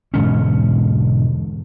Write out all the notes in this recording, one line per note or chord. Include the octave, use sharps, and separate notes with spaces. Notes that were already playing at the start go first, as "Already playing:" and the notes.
E1 G#2 D3 C#4